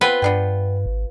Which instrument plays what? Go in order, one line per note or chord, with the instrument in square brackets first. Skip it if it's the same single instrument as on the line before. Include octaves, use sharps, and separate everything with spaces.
[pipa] B3 C4 [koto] F4 B4
[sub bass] G2 [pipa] B3 D4 G5
[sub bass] G#1